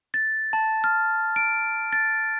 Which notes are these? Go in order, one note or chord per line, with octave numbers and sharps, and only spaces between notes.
A6
A5
F6
D7
A6